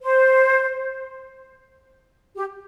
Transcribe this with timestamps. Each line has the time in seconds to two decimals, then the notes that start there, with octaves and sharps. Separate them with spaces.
0.02 C5
2.36 G4